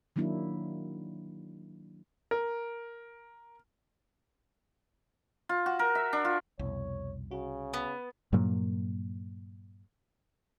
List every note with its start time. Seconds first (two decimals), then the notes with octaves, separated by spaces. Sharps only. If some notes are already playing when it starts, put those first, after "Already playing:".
0.16 D#3 F#3 A#3 D4 E4
2.31 A#4
5.49 F4
5.66 F#4
5.79 A#4
5.95 E5
6.13 D4
6.25 F4
6.59 C2 F2 B2 C#5
7.31 C#3 F#4
7.74 B3
8.32 G2 A#2 F#3 A#3